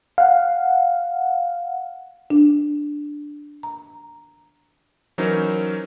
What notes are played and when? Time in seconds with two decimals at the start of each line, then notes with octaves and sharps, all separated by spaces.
0.18 F5 F#5
2.30 D4
3.63 A#5
5.18 E3 F#3 C#4 D#4 A#4 C5